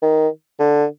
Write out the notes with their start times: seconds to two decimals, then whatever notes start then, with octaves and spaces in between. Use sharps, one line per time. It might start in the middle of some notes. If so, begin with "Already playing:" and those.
0.02 D#3
0.59 D3